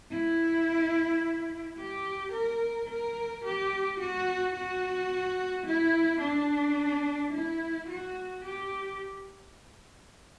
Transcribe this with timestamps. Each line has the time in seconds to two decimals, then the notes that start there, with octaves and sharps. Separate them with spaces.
0.12 E4
1.78 G4
2.33 A#4
2.89 A#4
3.44 G4
4.00 F#4
4.55 F#4
5.66 E4
6.21 D4
7.33 E4
7.89 F#4
8.44 G4